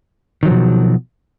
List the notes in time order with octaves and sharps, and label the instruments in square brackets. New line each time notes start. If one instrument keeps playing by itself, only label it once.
[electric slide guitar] D#3
F#3
F3
B2